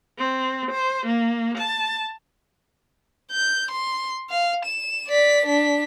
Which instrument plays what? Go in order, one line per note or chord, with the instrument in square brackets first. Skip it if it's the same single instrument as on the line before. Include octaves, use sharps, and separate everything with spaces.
[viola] C4
C5
A#3
A5
[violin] G6
C6
F5
E7
D5 B6
D4 B6